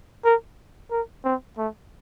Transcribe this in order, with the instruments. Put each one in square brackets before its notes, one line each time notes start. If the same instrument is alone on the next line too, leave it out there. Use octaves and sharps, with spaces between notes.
[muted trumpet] A#4
A#4
C4
A3